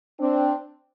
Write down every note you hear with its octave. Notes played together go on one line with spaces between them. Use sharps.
C4 D4